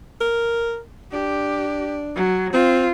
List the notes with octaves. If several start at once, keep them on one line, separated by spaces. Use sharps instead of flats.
A#4
D4 G4
F#3
C4 F4